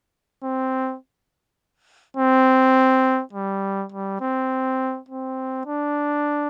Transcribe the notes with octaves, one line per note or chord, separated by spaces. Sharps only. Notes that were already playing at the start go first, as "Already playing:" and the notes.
C4
C4
G3
G3
C4
C4
D4